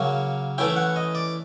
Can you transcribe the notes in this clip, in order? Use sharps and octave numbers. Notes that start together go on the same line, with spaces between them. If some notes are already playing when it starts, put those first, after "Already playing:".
Already playing: C#3 F#3 A#3 C#4
E3 A3 C#4 E4 G5
F#5
D#5
D5